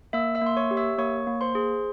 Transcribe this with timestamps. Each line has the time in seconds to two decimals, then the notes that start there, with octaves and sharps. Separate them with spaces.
0.13 A#3 E5 E6
0.35 E5 E6
0.42 A#3 C6
0.57 C#5 C#6
0.71 G4
0.77 E5 E6
0.98 A#3 C#5 C#6
1.27 A#3
1.41 C5 C6
1.55 G#4